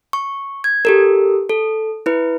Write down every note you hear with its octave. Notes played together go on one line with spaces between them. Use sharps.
C#6
G#6
G4 A4 A#4
A4
E4 B4